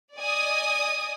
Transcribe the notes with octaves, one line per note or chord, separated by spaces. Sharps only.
D5 D#5 G#5 D#6